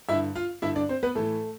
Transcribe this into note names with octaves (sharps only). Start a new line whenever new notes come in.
G2 D3 E4 E5
F4 F5
G2 D3 E4 E5
D4 D5
C4 C5
B3 B4
A2 E3 A3 A4